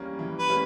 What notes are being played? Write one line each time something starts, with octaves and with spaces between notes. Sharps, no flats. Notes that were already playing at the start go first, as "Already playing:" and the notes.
Already playing: E3 G3 A#3 C#4
E3
B4
G3 A#3 C#4